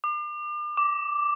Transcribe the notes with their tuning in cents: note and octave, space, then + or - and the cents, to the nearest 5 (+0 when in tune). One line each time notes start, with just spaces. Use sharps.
D6 +40
D6 -5